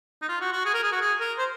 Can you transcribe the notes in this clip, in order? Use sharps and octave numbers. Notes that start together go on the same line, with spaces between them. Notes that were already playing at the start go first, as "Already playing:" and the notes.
D#4
F4
F#4
F#4
G#4
A#4
G#4
F#4
G#4
A#4
C5